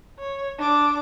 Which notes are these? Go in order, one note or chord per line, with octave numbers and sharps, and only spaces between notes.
C#5
D4 D6